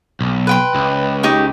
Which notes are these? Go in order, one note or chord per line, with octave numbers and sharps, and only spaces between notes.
B1
B4 G5 C6
C#2
D#4 G4 C#6